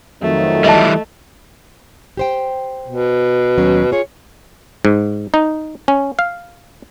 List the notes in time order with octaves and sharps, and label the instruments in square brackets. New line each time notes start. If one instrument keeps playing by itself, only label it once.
[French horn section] F2 D#3 F#3 [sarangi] A3
[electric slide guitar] E3 G3 [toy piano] D#5 E5 A5
[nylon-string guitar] G4 C5 G5
[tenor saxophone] B2
[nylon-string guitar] D#2 F#3 C#4
[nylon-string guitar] F4 G#4 [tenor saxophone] C#5
[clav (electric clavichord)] G#2
D#4
C#4
F5